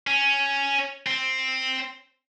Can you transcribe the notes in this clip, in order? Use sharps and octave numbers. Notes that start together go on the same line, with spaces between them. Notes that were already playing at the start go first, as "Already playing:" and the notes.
C#4
C4